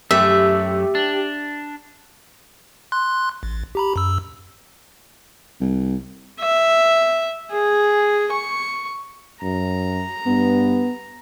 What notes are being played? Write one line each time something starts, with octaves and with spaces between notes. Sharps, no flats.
F#2 A3 G4 E5
D4
C6 F#6
A1
G4 A#5 B5
F#2 E6
C2
E5
G#4
C#6
F#2 A#5
G2 B3